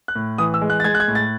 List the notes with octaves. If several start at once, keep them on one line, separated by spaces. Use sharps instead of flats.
F#6
A2
E3 D#6
E6
G#3
F#6
A6
G#3 G#6
F#6
G#6
A2
A6